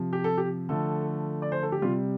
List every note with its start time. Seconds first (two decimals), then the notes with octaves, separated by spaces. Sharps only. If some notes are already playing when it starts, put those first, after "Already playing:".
Already playing: C3 F3
0.13 G4
0.24 A4
0.38 G4
0.69 D3 F3 A3 A4
1.42 D5
1.52 C5
1.63 A4
1.72 G4
1.82 C3 G3 F4